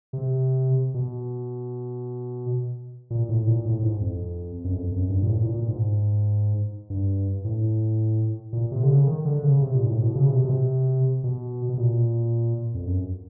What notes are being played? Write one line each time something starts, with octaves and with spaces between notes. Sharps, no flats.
C3
B2
A#2
A2
A#2
A2
G#2
F2
F#2
F2
F#2
G2
A#2
A2
A#2
A#2
G#2
G2
A2
A#2
C3
D3
C#3
D#3
D3
C#3
C3
A#2
G#2
A2
B2
C#3
C3
B2
C3
B2
B2
A#2
F2
F#2